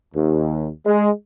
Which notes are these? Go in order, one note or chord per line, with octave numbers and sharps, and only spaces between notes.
D#2
G#3